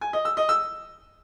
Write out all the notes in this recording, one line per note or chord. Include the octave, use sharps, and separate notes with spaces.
G#5
D#5
E6
D#5
E6